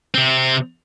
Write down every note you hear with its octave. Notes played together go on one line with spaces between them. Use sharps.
C3 C4